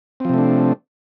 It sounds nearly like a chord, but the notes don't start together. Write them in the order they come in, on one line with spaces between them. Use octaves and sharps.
C4 F3 C3 A3 D4